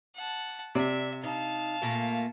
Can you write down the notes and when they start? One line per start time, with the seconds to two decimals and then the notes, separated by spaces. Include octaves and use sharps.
0.15 F#5 A5
0.75 C3 D5 E5
1.24 D#4 F5 A5
1.82 A#2 A3 A#3